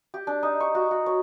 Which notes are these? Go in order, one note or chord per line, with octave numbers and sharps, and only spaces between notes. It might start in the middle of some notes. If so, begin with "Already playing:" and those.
G4
D4
D#4
C#6
F#4
F#4
C#5